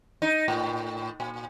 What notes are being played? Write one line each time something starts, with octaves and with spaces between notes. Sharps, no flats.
D#4
A2
A#2